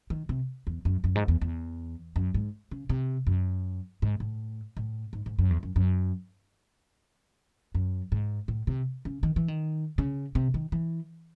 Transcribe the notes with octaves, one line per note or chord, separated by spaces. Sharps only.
D#3
C3
E2
F#2
F#2
G#2
E2
E2
F#2
G#2
C#3
C3
F#2
G#2
A2
A2
G#2
G#2
F#2
E2
F#2
F#2
F#2
G#2
A2
C3
C#3
D#3
E3
D#3
C#3
C3
D#3
E3